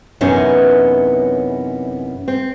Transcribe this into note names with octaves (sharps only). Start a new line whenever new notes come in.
F#2 C3 E3 B3 C#4 D#4
C4